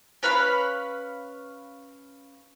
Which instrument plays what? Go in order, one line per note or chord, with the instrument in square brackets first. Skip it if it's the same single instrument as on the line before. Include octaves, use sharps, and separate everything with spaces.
[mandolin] C#4 B4 F5 B5